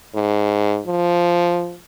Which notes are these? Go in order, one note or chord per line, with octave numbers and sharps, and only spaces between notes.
G#2
F3